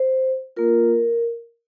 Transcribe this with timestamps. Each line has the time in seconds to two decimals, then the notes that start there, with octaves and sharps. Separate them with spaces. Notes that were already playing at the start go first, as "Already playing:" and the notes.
Already playing: C5
0.56 A#3 F4 A#4